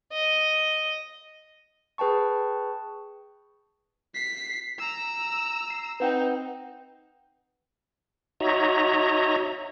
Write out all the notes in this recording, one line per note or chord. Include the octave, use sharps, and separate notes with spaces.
D#5
G#4 B4 G5 A5 C#6
B6 C7
A#5 E6
C7
C4 D#4 B4 F#5 G5
D#4 F#4 C#5 D#5 E5 A#5